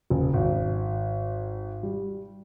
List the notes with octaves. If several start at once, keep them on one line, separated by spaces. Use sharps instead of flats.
F#1
G#1
G3